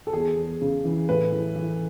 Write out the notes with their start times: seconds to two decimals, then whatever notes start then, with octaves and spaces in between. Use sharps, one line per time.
0.07 A4
0.13 E2 G#4
0.37 E2
0.62 C#3
0.85 E3
1.09 A2 B4
1.32 E3
1.56 E3